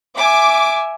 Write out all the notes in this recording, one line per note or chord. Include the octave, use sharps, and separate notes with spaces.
E5 G#5 D6